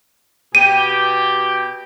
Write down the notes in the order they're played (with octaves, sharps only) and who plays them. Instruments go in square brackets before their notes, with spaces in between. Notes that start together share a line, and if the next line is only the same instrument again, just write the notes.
[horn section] B2 G4 [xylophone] D#7